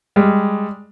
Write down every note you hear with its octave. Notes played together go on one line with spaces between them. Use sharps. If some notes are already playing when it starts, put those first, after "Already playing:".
G3 G#3